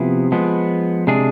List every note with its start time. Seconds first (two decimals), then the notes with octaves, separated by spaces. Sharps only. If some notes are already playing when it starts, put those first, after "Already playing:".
Already playing: C3 F3 B3 E4 G#4
0.32 F3 G#3 B3
1.07 C3 G#3 D4 G#4